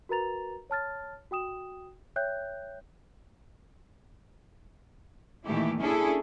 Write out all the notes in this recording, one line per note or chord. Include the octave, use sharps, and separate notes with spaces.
F#4 A#4 B4 A#5 A6 F7
C#5 A5 F6 A6
F#4 G5 D#6 E7
C#5 E5 G5 F#6 G6
A#2 D#3 E3 A3 E4 G4
C#4 D4 E4 G#4 A4